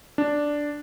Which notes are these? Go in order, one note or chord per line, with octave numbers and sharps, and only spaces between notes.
D4